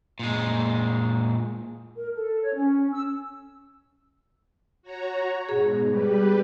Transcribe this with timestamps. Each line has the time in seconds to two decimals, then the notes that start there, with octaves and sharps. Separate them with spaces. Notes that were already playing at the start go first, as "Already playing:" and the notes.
0.19 A#2 G#3
1.97 A#4
2.15 A4
2.42 C#5
2.55 C#4
2.92 E6
4.82 F#4 C#5 A#5
5.49 G#2 B2 G#4
5.88 G3 G4 B4